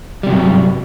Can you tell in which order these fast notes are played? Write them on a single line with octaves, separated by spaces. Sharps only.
G3 C3 F#3 G2